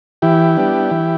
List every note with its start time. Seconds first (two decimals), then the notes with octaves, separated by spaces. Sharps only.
0.22 E3 E4 G4
0.57 G3 B3 D4
0.91 E3